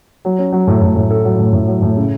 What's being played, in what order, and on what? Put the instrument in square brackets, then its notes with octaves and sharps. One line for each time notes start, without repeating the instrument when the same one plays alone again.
[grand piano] F#3
C#4
F#3
A2
A2
A2
A4
F#3
A2
A2
F#3
A2
C#3